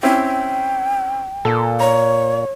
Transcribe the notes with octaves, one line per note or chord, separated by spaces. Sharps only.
C4 C#4 E4 G5
A#2 A4
C#5 A#5